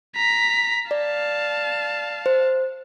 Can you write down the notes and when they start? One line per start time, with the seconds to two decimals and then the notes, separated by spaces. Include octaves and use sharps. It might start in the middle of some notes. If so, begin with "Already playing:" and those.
0.16 A#5 B6
0.91 D5 F5 A5
2.26 C5